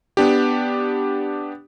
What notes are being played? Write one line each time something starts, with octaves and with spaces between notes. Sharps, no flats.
B3 D4 G4